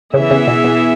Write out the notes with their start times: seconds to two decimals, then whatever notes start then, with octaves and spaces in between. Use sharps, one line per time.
0.14 C#3 E3 B3 G#4 E5
0.31 C#3
0.47 B2
0.64 B2